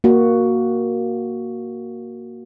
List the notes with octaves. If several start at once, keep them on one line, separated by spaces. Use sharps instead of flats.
A#3 F#4